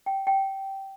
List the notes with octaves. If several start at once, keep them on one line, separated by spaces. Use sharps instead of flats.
G5
G5